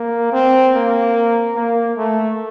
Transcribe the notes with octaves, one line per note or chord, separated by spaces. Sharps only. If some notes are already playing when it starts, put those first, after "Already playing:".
Already playing: A#3
C4
A#3
A#3
A3